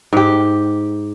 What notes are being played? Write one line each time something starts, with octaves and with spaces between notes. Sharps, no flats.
G#2 G4